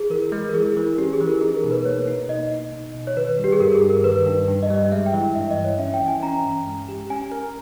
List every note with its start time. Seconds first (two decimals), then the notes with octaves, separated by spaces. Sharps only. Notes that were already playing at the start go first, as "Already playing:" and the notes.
Already playing: G#4
0.10 E3 A#4
0.32 G#3
0.49 A#4
0.54 E3 G#4
0.77 E3
0.98 C#4 G4
1.13 G#4
1.20 E3
1.27 A#4
1.41 D#4 G#4
1.57 A#4
1.64 B2
1.71 B4
1.85 A#3 C#5
2.07 D#4
2.29 B2 D#5
2.52 D#4
2.73 B2
2.94 B2
3.07 C#5
3.16 D#3 B4
3.39 G3 G4
3.52 G#4
3.60 G2 A#4
3.75 G#4
3.82 G2
3.90 A#4
4.04 D#3 B4
4.26 G2
4.48 G2
4.63 D#5
4.70 G3
4.77 D#5
4.92 G#3 E5
5.06 G5
5.13 E3
5.21 G5
5.35 G2 E5
5.50 D#5
5.58 E3
5.64 C#5
5.79 C#4 E5
5.94 G5
6.00 E3
6.08 G#5
6.23 C#4 A#5
6.45 G2
6.67 G#3
6.89 G4
7.10 C#4 G#5
7.32 A#4